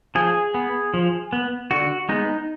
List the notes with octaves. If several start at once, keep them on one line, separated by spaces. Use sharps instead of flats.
F3 G#4
B3
F3
B3
D3 F#4
G#3 B3 D#4